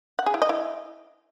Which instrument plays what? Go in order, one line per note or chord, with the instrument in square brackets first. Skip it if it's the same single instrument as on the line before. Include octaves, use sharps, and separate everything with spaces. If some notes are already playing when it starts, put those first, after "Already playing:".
[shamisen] F#5
G#4
E4
D#5
E4